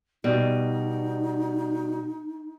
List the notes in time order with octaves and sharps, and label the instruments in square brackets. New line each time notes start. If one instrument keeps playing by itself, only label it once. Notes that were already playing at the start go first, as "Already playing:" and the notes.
[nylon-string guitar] B2 G3 [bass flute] D#4